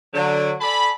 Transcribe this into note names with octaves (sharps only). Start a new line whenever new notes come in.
D3 F#3
A4 D5 G#5 A5 B5